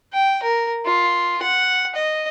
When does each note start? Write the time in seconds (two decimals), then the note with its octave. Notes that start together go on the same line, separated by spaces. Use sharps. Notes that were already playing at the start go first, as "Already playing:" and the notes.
0.13 G5
0.43 A#4
0.86 F4
1.42 F#5
1.96 D#5